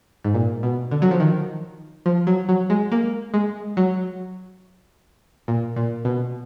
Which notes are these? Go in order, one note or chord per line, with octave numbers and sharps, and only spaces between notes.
G#2
A#2
B2
D3
F#3
F3
D#3
F3
F#3
F#3
G#3
A#3
G#3
F#3
A#2
A#2
B2